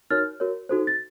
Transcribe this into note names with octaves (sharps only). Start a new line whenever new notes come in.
D#4 F#4 A#4 C#5 F6 A6
F#4 A#4 C#5
D#4 F#4 A4 C5
A6